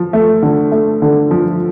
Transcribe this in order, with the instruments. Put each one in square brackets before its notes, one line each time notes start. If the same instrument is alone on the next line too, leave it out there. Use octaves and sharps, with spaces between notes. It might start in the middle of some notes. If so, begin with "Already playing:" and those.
Already playing: [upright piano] F3
A3
D3
A3
D3
F3